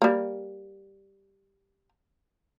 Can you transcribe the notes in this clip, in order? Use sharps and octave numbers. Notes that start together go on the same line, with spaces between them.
G3 A#3